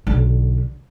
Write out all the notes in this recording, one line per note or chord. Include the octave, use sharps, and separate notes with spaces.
B1 D3